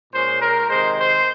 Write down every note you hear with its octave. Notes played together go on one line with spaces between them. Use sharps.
A#2 G#3 C#4 C5
A#4
C3 D#3 G#3 C5
C5